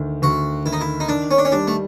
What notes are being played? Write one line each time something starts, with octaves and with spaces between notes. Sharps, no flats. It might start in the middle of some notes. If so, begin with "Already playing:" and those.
Already playing: D2 D#3
D2 F#4
D#3 E4
D#4
E4
D#4
D#3 D4
C#4
D4
C#4
G3 D4
A3